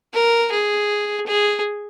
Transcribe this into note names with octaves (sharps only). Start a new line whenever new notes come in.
A#4
G#4
G#4